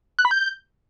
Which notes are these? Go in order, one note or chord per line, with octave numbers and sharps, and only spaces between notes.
F#6
B5
G6